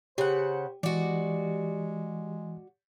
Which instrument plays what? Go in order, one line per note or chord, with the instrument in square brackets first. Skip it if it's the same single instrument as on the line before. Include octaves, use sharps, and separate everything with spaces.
[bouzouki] C#3 F#5 [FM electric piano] G4 [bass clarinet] C5
[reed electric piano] E3 [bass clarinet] G#3 [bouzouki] F#4 D5